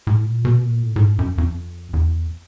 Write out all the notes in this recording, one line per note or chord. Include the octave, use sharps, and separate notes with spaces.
A2
A#2
B2
A#2
A2
A2
G#2
F#2
F2
E2